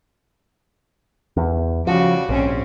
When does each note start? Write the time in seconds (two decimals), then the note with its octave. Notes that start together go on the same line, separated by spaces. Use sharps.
1.37 E2
1.87 C#3 F3 G3 F#4
2.29 A#1 G#2 C4 C#4